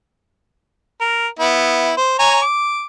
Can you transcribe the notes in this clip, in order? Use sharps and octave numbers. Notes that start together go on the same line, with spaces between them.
A#4
B3 E4
C5
C#5 G#5 A#5
D6